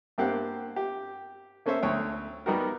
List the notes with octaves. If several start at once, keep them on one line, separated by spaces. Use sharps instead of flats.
G2 A#3 C4 G4 F#5 F#6
G4
A#3 C#4 A4 C5 E5
D2 C#5 G5
G3 B3 D#4 F#4 G4 A#4